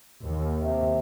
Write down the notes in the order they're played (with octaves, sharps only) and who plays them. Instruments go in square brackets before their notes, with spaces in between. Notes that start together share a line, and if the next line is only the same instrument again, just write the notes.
[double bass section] D#2
[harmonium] C3